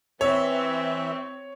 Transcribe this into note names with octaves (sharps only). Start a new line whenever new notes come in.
E3 C4 C#5 E5